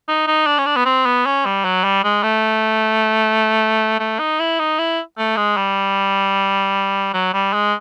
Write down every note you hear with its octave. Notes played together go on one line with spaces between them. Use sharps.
D#4
D#4
D4
C#4
D4
B3
C4
B3
C#4
G3
F#3
G3
G#3
A3
A3
D#4
E4
D#4
E4
A3
G#3
G3
F#3
G3
G#3